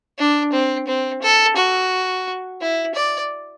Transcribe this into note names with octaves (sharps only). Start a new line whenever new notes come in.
D4
C4
C4
A4
F#4
E4
D5